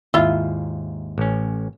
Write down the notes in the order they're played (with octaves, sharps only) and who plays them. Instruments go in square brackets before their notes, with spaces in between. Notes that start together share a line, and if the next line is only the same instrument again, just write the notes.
[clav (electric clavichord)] D#2 G#2 [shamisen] E4 F4
[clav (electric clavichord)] A1 C#4